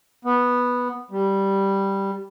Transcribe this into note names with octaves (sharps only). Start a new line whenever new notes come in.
B3
G3